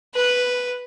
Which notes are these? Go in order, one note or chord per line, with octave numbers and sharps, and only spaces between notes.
B4